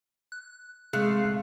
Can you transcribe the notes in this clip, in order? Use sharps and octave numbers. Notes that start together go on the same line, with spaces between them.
F#6
C3 G#3 A3 G#4 F5 C6 F#6